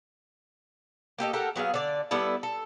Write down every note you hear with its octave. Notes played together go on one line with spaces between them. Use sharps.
A#3 G4 A4 D#5
G4 A4 A#4 F#5
F#3 B3 G#4 F5
D3 D5
G3 B3 E4 A4
A4